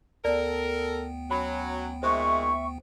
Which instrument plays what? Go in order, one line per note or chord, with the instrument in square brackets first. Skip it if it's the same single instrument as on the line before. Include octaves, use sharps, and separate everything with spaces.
[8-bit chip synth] D2 B3 G5 [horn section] A4 A#4 [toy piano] D5
[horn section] F#3 [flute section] C#4 [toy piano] B5
[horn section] A#2 D#3 G#3 [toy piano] C5 [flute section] E5 C#6